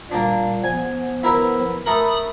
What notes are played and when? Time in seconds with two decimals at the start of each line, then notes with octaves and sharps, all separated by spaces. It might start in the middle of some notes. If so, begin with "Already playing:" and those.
0.11 A#2 G3 A#3 D4
0.64 F3 B3 G#5
1.23 E4 A#4 B4
1.86 A3 A#4 B5 D#6